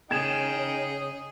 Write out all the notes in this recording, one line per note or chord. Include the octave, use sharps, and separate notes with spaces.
C#3 D#4 G#4 G5 G#6 E7 F7